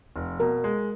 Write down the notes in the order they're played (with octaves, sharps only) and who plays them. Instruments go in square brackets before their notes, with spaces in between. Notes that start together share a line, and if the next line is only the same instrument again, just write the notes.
[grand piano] F1
[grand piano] B2 [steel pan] A#4
[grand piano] G#3